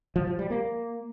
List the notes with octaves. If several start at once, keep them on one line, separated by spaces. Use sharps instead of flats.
F3
F3
G3
A#3